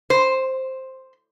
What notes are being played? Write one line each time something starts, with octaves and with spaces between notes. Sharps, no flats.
C5